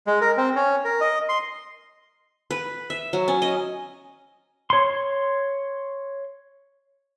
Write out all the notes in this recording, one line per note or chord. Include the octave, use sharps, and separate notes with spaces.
G#3
A#4
C4
C#4
A#4
D#5
C6
B4
E5
F#3
C#4
D#5
C#5 C6